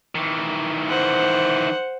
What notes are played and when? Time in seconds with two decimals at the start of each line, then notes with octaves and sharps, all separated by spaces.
0.15 D#3 E3
0.88 C5 F#5